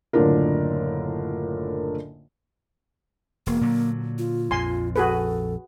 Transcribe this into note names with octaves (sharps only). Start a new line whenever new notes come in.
F#1 A2 D3 D4 F4 A#4
E1 A#3
A#2 D3 F#3
F4
A#1 F2 G#5 C6
F#4 G#4 A4 B4